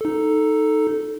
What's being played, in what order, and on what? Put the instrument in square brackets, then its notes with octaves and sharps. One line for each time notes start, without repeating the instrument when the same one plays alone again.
[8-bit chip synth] D#4 A4